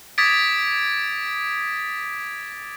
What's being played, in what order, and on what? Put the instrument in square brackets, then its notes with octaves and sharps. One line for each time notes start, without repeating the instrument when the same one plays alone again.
[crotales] D6 D#6 G#6 A6 B6 D7